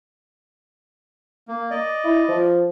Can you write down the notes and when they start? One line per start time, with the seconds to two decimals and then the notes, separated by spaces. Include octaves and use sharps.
1.48 A#3
1.71 D5 D#5
2.05 E4
2.28 F3